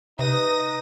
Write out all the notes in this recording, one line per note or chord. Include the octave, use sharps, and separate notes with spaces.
C3 D#4 B4 D#6 A#6